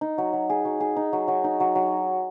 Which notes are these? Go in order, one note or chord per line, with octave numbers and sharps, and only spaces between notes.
D#4
F#3
F#3
G#4
F#3
G#4
D#4
F#3
F#3
D#4
F#3
F#3